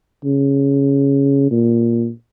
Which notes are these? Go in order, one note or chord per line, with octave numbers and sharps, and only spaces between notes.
C#3
A#2